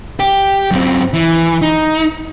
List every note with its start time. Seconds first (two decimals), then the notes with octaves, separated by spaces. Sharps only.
0.20 G4
0.71 F#2 C4
1.14 E3
1.62 D#4